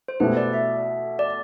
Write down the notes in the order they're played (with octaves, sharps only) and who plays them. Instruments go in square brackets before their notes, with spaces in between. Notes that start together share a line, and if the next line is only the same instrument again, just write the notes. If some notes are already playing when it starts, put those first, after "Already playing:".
[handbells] C5
[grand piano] B2 A3 E4 G4 [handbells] B4
[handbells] D5
E5
D5